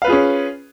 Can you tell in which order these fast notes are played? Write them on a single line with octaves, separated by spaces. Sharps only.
F5 B4 F4 G#4 C#4